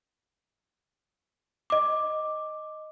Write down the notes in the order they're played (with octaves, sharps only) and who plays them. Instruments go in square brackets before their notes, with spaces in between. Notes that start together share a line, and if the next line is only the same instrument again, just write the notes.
[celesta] D#5 D6